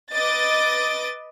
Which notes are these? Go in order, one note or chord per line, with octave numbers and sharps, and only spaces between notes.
B4 D#5 D6 A6